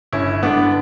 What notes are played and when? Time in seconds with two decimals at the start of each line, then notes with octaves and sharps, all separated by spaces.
0.12 G1 C#4 E4
0.43 G2 D3 B3 D4